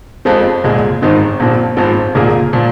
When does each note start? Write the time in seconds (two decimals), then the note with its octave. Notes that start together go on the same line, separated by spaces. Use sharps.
0.25 F2 F3 G#3 C4
0.64 C2 A#2 G#3
1.02 G#1 G#2 D#3 C4
1.40 A#1 A#2 F3 C4
1.77 G#1 G#2 F3 C4
2.15 C2 A#2 A#3 F4 G#4
2.53 A#2 F3